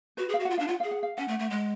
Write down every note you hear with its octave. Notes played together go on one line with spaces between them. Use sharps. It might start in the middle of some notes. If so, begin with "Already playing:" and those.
F#4 B4
G#4
F5
F#4
F#5
F4
D4 F5
F4 F#5
G#4 F5
F#5
F5
C#4 F#5
A3
A3
G#3